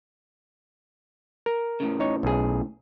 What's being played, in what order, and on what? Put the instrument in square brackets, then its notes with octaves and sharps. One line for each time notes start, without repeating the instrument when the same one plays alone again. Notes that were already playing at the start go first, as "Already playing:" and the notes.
[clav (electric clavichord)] A#4
[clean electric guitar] A2 C#3
[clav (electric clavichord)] D#4 C#5
B1 G#4